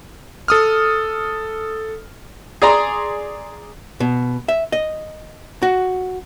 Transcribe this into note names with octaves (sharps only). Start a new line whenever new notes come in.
A4 D#6 F6
G#4 D5 A#5 C6
B2
E5
D#5
F#4